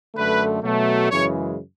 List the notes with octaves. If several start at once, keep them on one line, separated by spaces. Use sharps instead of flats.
F#2 D3 A3 B4
B2 F#3 A3
F#2 C#3 E3 G#3 C#5